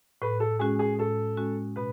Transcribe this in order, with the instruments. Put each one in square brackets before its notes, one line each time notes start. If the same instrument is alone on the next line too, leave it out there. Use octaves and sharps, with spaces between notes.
[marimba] A2 [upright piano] B4
[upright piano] A4
[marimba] G#3 C#4 F#4 [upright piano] G#4
[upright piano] G#4
[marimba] A2 [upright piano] A4
[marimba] G#3 C#4 F#4
[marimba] B2 [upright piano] B4